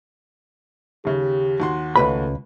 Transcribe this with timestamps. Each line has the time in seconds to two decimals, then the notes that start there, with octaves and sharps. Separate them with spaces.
1.05 D#2 C#3 G4
1.60 D#2 F#4 C6
1.96 C#2 A3 B4 B5